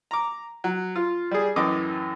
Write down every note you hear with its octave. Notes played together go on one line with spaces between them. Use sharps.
A#5 D6
F#3
F4
G3 G#4
F#2 A2 E3 D#5 D6